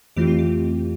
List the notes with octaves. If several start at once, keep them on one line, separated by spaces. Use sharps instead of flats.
F2 E3 A3 C4 F4 G4
F4
G4